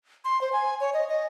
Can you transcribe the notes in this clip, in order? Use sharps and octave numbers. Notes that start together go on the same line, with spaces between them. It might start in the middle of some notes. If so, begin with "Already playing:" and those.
C6
C5
G#5
C#5
D#5
D#5